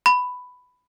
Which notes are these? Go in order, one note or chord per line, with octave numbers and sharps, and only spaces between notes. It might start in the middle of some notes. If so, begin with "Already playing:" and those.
B5